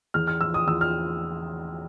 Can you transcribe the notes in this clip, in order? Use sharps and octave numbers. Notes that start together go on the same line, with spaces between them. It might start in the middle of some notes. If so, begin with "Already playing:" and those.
E2 F6
F6
F3 E6
D#6
E2 E6
F6